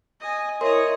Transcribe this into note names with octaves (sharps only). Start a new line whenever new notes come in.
D#5 G#5
E4 A#4 C#5 D#5 C6